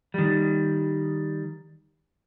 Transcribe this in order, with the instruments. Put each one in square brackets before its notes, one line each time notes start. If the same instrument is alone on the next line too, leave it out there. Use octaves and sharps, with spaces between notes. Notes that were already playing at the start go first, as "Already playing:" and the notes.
[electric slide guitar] D#3 G3